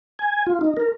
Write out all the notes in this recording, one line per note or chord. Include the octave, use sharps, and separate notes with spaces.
G#5
F4
D#4
A#4